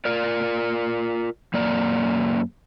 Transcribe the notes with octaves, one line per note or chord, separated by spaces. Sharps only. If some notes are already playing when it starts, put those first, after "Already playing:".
F4 A#4 D5
F#2 A#3 D5